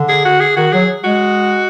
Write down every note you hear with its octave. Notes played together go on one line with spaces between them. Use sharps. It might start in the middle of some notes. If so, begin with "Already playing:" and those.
Already playing: D3
G#4
F#4
G#4
D#3 F#4
F#3 G#4
G#3 F#4